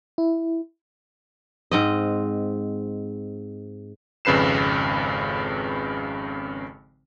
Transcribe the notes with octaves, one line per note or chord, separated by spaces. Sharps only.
E4
G#2 C4 D#5
G#1 F2 C#3 B4 C7 E7